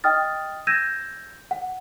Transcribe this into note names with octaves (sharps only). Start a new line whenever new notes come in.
D#5 G5 D#6 F6 A6
E6 G6 G#6 A#6 D#7 E7
F#5